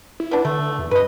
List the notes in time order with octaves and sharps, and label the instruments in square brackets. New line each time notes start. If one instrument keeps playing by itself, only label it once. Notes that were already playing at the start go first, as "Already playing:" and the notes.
[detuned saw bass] E4
[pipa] B3 D4
[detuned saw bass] D3 [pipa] A3
[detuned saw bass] E2
[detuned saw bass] G2 [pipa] B4 D#5